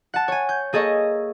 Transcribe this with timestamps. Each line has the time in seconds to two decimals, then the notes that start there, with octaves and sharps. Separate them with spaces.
0.14 F#5 A5
0.28 C#5 G#5
0.49 G6
0.73 A#3 G#4 A4 D#5 C#6